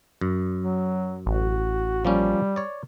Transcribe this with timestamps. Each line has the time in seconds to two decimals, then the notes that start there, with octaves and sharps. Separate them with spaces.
0.21 F#2
0.63 F#3
1.26 A1 F#4
2.05 F3 G3 A#3 C#4
2.56 C#5 D5